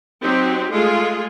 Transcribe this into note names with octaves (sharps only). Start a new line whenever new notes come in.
F#3 C4 D#4 F#4 G4
G#3 A3 F4 G#4